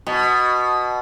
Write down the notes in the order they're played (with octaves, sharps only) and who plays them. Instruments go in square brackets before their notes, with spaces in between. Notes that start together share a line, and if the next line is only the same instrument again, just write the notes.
[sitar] B2